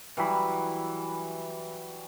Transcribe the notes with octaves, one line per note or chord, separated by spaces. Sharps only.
E3 F#3 G3 B5